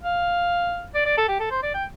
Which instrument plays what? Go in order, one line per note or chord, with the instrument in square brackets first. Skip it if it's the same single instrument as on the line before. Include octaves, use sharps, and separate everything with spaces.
[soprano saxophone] F5
D5
D5
A4
G4
A4
C5
D5
G5